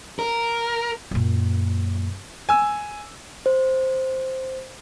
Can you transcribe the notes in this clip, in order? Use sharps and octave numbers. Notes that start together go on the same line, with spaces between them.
A#4
F#2 A#2
G#5 E6
C5